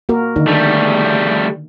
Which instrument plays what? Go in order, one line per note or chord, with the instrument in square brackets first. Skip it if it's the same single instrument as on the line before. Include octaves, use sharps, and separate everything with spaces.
[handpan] A#3 F#4 A#4
D3 D#3 D#4
[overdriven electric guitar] G3 A3